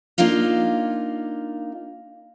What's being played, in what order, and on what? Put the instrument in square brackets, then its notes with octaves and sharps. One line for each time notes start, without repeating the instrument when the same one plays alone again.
[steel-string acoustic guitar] A#3 D4 D#4 F4 F5